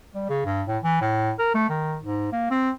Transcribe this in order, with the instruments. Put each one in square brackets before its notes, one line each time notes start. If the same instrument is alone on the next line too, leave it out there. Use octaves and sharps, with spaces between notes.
[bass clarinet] G3
C#3
G2
A2
E3
A2
A#4
A3
D#3
G#2
A#3
C4